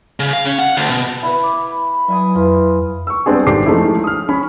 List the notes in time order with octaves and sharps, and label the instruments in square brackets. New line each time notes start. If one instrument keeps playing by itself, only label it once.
[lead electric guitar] C#3
F5
C#4
F#5
D2
B2
[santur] E4 B4
[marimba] D6
[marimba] F#3 [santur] E4 G#5 D#6
[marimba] F2 E4 B4 [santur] F4
[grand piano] C#6 E6
G3 B3 C4 D4 G#4
G#1 D4 G4 A4 D6 C7
F3 G#3 A3 C#4 D#4 E4
D#6 F6
C#4 B5